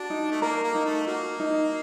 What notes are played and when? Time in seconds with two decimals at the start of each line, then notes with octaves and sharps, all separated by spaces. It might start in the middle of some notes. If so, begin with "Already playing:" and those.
Already playing: D4 F#4
0.10 D#4
0.32 A3
0.41 A#3 A#4
0.64 A#3
0.75 D#4
0.85 A3
1.06 A#3 F#4
1.40 D#4